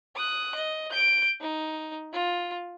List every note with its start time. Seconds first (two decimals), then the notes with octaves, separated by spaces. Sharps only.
0.16 D#6 F#6
0.55 D#5
0.90 G6 D7
1.41 D#4
2.13 F4